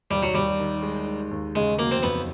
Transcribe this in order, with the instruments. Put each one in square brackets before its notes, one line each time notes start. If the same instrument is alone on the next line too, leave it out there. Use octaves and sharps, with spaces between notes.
[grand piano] D#2 [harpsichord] G3
[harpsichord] F#3
[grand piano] D#2 [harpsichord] G3
[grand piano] D#3
G#3
G#3
D#2
[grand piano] C#3 [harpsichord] G#3
[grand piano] F#3 [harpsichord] A#3
[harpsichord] C4
[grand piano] F2 [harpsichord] B3